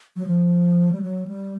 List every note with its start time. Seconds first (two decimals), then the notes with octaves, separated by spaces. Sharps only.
0.16 F#3
0.27 F3
0.92 G3
1.02 F#3
1.27 G3